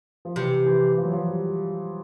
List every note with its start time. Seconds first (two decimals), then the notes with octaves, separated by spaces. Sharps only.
0.25 F3
0.36 C3 E3
0.66 E3
0.97 F3
1.05 F#3
1.13 F3
1.28 G3